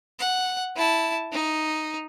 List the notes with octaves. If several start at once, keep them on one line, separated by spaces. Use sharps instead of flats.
F#5
E4 A5
D#4